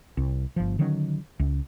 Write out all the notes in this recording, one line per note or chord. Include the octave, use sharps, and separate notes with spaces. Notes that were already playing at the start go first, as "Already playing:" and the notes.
C2
G1 F3
D3 D#3 F#3 C#4
C#2